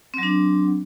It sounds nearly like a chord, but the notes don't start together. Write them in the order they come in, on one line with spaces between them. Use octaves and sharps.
C4 F#3 D4